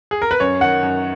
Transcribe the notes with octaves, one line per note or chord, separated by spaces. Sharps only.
G#4
A#4
B4
F#2 C#5
D#3 F#5
F#2